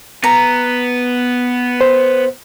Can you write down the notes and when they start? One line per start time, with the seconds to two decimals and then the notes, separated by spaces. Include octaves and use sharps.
0.24 B3 A#5
1.81 C5